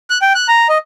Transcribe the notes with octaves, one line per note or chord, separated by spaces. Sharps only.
F#6
G5
F#6
A#5
D#5